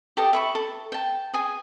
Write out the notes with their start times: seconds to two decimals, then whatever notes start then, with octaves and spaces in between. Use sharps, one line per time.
0.17 G4 A4 D5 D#5
0.33 E5 B5 C#6
0.55 A4
0.92 G5 A5
1.34 G#4 G#5 D#6